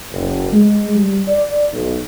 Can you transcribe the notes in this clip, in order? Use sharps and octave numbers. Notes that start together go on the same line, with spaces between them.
F#1
G#3
G3
D5
B1